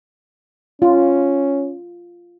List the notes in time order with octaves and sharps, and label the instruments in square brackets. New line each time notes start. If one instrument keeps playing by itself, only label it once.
[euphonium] C#4 [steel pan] F4